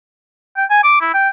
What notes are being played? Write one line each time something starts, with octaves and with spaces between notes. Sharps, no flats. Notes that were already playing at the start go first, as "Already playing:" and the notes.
G5
G#5
D6
E4
G5